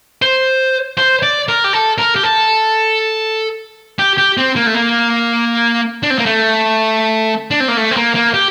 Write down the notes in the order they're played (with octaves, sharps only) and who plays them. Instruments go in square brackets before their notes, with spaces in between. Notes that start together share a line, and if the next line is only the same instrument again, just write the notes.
[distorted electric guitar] C5
C5
D5
A#4
G4
A4
A#4
G4
A4
G4
G4
C4
A#3
A3
A#3
D4
C4
A#3
A3
D4
C4
A#3
A3
C4
A#3
A#3
G4